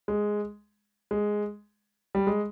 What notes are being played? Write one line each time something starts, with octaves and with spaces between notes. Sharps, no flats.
G#3
G#3
G3
G#3